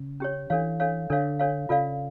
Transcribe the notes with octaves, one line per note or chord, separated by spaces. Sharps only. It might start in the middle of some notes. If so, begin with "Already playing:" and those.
Already playing: C#3
C#4 G4 C#5
E3 D4 A4 C#5 F5
D4 A4 C#5 F5
D3 D4 A4 C#5 F5
D4 A4 C#5 F5
C#3 F4 A4 D5 F5